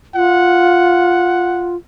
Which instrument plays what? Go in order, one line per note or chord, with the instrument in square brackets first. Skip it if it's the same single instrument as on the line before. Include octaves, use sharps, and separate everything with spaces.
[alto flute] F4 [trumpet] F#5